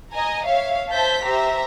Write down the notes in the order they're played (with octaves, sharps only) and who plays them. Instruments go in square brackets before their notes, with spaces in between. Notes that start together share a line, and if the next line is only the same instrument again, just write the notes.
[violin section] D#5 G#5 A#5
C#5 E5 F5
C5 E5 A5 G6 B6
G4 C5 E5 A#5